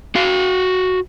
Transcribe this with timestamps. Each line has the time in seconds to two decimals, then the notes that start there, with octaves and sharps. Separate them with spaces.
0.15 F#4 F5